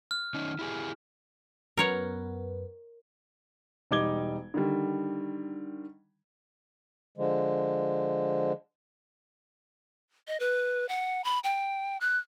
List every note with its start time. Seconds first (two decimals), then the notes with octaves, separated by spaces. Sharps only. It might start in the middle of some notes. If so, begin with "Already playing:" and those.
0.11 F6
0.34 D#3 C#4 D#4
0.59 E4 G4 G#4
1.77 F#2 B3 A#4 C#5 F#5
3.91 E1 G3 D#4 D6 G#6 G7
4.54 D3 D#3 G3
7.18 D3 F3 G#3
10.28 D#5
10.40 B4
10.89 F#5
11.24 B5
11.44 G5
12.01 F#6